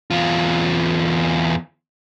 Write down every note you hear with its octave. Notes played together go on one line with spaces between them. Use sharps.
E2 F4